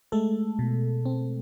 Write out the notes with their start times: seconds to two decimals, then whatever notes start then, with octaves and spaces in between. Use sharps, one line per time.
0.12 G#3 A3 A4
0.59 B2
1.05 C4